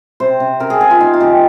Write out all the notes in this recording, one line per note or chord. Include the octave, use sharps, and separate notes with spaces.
C3 C5
C3
C3 A#4
G#4
C3 G#4
F4
A#3 D#4
F4
D#3 G4